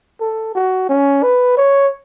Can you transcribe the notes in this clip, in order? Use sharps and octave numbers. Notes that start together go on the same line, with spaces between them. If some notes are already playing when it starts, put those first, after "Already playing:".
A4
F#4
C#4
B4
C#5